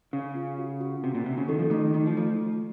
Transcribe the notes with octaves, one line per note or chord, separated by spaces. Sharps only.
C#3 F5
F4
F#4
F#4
C3 F#4
A#2
C3 F#4
C#3
D#3 A4
F3
D#3 A3
D#3 A3
F3
F3 A3